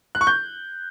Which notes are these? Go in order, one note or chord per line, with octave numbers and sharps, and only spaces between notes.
F#6
C#6
G6